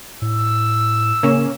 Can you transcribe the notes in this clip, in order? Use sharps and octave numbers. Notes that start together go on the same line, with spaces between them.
A2 E6
C#3 A#3 C#4